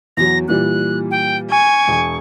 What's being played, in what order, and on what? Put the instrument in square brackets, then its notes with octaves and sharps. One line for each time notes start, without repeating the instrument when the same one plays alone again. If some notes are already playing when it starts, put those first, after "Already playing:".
[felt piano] E2 F#3 [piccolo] A#6
[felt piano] A#2 E3 G3 [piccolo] F#6
[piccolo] G5
[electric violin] G#5 [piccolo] C#6
[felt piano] E1